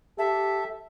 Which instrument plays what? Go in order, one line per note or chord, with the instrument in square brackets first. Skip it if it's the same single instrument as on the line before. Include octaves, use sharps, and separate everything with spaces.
[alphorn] G4 [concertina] A4 [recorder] E5